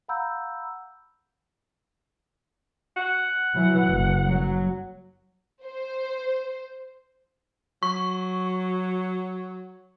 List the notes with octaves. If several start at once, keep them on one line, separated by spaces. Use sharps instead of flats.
F5 F#5 A#5 B5 E6 G6
F#5
E3 F#3
F#1
F#3
C5
F#3 C#6